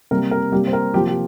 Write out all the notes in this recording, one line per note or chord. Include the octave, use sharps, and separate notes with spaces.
C3 G3 A#3 A#4
A#4
C3 G3 A#3 G4
C5
A#4
C3 F3 A#3 G4
G4